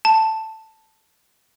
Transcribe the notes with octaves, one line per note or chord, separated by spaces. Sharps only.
A5